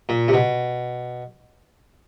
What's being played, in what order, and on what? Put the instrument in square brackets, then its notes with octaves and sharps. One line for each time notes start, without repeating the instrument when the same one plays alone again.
[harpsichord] A#2
C3
B2